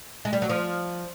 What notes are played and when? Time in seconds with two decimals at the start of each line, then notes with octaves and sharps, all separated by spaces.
0.25 G#3
0.33 G3
0.42 F#3
0.49 F3